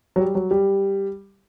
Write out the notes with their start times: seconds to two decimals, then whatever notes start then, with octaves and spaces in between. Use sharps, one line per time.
0.16 F#3
0.20 G3
0.35 F#3
0.51 G3